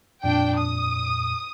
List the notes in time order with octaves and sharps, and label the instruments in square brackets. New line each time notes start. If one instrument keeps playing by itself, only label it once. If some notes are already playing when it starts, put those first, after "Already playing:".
[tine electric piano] F2 A#2 [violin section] D4 G5
[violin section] D#6